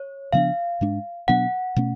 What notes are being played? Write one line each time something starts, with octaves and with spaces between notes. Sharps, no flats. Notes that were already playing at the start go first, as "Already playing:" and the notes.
Already playing: C#5
C#3 F3 B3 D4 F5
G#2 G#3 D4
B2 F#3 B3 D4 F#5
B2 A3 C#4